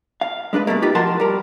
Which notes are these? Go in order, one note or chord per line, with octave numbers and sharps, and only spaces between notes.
F5
G#3 D4 A4 B4
B2 E3 G3 A3 A#3
D#4 F4 G4 B4
F3 F#4 A#4 F#5 A5 C6
G3 A#4